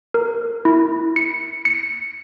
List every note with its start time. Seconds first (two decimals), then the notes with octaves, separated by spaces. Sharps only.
0.14 A#4
0.65 E4
1.16 C#7
1.65 C#7